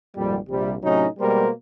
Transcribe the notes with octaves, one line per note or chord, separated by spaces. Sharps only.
G#1 F2 A#2 G3
A#1 C3 G3
A2 C3 F#3 C#4 D#4
B2 G3 G#3 A#3 A#4 C5